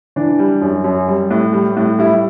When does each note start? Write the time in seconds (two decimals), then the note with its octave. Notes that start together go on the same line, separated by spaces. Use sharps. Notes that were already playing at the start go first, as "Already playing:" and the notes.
0.16 E3 D4
0.39 G3
0.61 F#2
0.84 F#2
1.08 G3
1.31 A2
1.53 G3
1.77 A2
1.99 G3 E4